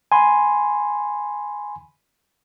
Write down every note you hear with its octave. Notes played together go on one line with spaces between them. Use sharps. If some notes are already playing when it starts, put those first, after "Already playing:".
G#5 B5 C6